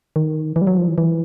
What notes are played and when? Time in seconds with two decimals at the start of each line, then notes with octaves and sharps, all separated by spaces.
0.16 D#3
0.56 E3
0.62 G3
0.67 F#3
0.77 F3
0.87 E3
0.98 E3